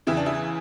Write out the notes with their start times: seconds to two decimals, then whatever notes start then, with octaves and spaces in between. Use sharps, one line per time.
0.07 E2 C#3 E3 E4
0.17 D4
0.26 E4